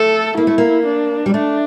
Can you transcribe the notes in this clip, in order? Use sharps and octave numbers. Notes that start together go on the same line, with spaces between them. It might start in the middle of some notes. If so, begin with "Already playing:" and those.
Already playing: A3 A4
A#3 E4
A3
A#3
D4
G3
A3 D4